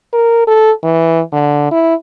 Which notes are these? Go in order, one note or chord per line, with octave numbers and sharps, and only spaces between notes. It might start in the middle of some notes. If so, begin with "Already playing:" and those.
A#4
A4
E3
D3
E4